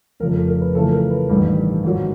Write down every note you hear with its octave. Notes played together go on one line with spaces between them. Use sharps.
F1 F2 C#3 A#4
A4
A#4
B4
F2 C#3 E3 A3 A4
A#4
B4
A1 G2 D#3 G3
G#2 D#3 F#3